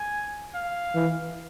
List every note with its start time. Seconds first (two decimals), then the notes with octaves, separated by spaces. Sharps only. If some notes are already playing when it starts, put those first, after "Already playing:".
Already playing: G#5
0.55 F5
0.95 E3